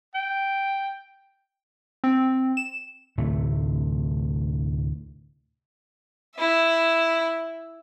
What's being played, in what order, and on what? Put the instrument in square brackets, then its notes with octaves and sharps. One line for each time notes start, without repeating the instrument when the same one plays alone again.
[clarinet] G5
[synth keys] C4
E7
[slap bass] D2 A2 C3 A3
[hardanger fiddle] E4 E5